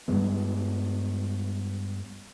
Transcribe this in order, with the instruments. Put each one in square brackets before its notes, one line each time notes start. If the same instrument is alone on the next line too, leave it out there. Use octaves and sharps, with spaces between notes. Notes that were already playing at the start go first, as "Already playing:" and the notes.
[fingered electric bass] G2 G3 G#3 B3